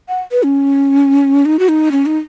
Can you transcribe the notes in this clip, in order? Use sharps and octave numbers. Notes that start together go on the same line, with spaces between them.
F#5
B4
C#4
D#4
F#4
D#4
C#4
D#4